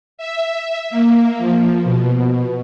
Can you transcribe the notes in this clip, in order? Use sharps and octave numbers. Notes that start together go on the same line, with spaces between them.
E5
A#3
F3
B2